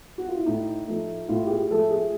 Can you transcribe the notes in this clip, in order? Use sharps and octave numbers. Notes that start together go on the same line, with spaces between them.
F#4
F4
E4
A2 D#4
F3 A3
A2 F4
G4
G#4
F3 A3 A4
G#4